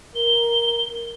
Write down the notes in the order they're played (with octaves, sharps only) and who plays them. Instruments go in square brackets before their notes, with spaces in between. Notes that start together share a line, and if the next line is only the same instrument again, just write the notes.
[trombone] A#4 [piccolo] G7